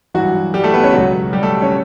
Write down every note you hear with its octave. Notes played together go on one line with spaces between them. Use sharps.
G2 E3 F#3 F#4
G3 G4
A3 A4
B3 B4
C#4 C#5
C#2 B2 F#3 F#4
G3 G4
A3 A4
C#4 C#5